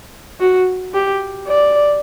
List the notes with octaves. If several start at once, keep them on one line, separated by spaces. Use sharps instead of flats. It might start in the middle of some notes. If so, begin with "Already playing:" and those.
F#4
G4
D5